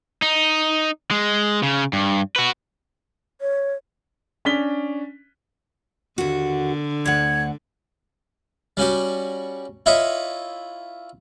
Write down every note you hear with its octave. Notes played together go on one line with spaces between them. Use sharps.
D#4
G#3
C#3
G2
F#4 B4
C#5
C#4 D4 B6 G7
D#2 D3 F#4
D2 F#5 G#6
G3 C#4 F#4 G4
E4 F4 C#5 D#5 E5